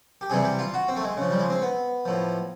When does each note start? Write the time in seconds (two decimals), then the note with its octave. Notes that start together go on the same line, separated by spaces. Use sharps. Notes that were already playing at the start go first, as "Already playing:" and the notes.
0.21 G4
0.30 C3 E3 G3 G#4
0.44 G4
0.59 F4
0.74 F#4
0.88 C4
0.96 A3
1.04 G#3
1.17 C#3 F3
1.31 G3
1.39 G#3
1.50 C4
1.62 B3
2.05 A2 F3